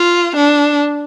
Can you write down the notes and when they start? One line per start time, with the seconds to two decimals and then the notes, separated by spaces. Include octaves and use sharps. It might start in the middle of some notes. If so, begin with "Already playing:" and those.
Already playing: F4
0.36 D4